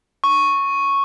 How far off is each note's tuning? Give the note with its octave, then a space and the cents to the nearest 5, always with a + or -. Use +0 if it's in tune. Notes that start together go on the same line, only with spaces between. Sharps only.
C#6 -5